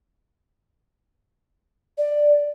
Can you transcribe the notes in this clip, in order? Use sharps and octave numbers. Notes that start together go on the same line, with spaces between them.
D5